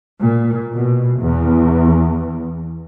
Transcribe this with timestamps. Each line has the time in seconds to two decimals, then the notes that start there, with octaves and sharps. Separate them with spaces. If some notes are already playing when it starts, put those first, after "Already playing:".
0.20 A#2
0.73 B2
1.21 E2